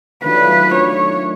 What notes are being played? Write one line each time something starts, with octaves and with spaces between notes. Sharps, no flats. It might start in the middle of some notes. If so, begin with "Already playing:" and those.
D#3 F#3 A3 D4 F4 B4
D#3 F#3 A3 D4 F4 C#5